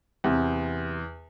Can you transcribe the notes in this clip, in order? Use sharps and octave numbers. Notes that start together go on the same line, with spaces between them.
E2 C3